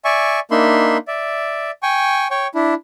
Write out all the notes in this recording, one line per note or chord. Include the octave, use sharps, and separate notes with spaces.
D5 E5 G#5 C#6
A#3 D4 D#4 E5 B5 C6
D5 E5
G5 G#5 C#6
C#5 G5 C#6
D4 E4